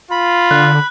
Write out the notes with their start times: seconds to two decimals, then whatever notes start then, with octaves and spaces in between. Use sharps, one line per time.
0.11 F4 B5
0.51 D3 F#6